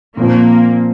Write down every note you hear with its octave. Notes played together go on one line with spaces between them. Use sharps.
A#2 F3 A#3 C4